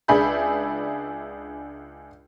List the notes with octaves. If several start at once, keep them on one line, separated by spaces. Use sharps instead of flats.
C#2 D4 G#4 E5 B5 G6